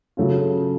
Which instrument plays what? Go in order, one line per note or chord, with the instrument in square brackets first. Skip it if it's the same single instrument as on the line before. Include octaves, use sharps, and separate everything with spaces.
[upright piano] C#3 F#3 A3 C#4 F4